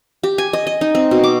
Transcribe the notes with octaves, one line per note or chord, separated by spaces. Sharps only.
G4
G#5
D#5
D#5
D#4
C4
B2
D6